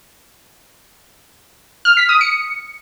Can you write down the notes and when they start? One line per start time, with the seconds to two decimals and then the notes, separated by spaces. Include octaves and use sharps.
1.85 F6
1.97 B6
2.09 D#6
2.21 C#7